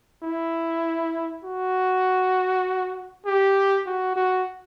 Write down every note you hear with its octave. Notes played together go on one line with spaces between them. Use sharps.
E4
F#4
G4
F#4
F#4